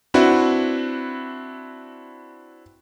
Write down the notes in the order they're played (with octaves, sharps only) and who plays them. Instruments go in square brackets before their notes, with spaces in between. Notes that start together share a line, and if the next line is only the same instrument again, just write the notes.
[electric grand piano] C4 D4 E4 F#4 B4